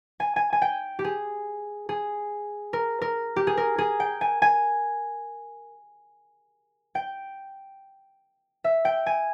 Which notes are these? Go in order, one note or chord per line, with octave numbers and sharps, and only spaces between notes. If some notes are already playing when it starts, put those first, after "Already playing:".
G#5
G#5
G#5
G5
G4
G#4
G#4
A#4
A#4
G4
G#4
A#4
G#4
G5
G#5
G#5
G5
E5
G5
G#5